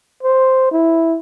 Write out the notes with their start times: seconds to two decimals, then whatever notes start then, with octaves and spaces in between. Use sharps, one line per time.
0.23 C5
0.71 E4